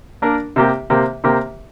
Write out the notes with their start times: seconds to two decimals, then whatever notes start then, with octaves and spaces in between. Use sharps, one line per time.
0.22 A#3 D4 A#4
0.56 C3 A#3 G4
0.90 C3 A#3 G4
1.24 C3 A#3 G4